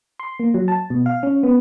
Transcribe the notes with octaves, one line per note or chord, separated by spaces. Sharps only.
C6
A#3
F#3
A5
B2
F5
C#4
B3